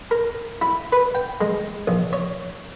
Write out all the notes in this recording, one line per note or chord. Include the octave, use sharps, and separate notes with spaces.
A#4
E4
B4
G5
G#3
A#1
C#5